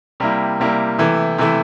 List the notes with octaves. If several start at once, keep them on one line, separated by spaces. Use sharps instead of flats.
C3 G3 A#3 E4
C3 G3 A#3 E4
C3 E3 A3 E4
C3 E3 A3 E4